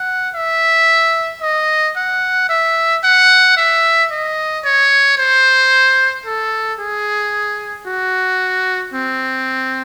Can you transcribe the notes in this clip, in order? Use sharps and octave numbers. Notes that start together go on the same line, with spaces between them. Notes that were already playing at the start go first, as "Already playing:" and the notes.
Already playing: F#5
E5
D#5
F#5
E5
F#5
E5
D#5
C#5
C5
A4
G#4
F#4
C4